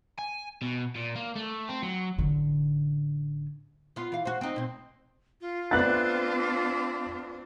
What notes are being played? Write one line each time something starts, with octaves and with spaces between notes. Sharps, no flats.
G#5
B2
A#2
A#3
A3
C4
F#3
A1 D3
B3 F4
E3 F5
F#4 C5
C4 D#4
B2 C4
F4
A3 B3 C4 D4 D5 F#6 A6